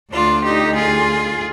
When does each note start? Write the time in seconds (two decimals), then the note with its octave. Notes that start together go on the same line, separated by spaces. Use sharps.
0.12 D2 D3 D4 F4
0.44 D#4 G4
0.75 F4 G#4